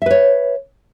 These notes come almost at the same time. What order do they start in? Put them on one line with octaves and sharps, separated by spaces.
E5 B4 C#5